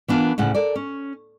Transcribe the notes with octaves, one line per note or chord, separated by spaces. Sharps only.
E3 B3 D4 F4 A#4
D2 A2 C#3 F#5
A4 A#4 D5
C#4